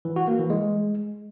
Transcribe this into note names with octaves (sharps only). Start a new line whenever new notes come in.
E3
F#4
A#3
E3
G#3